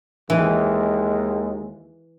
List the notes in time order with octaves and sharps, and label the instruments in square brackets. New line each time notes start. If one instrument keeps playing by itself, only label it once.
[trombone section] D#2 G#3 [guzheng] E3